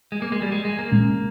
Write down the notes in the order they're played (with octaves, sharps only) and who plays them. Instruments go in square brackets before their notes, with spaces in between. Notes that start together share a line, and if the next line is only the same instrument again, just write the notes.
[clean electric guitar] G#3
A#3
G#3
G3
G#3
G#3
A#3
[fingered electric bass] A#2 G#3 C#4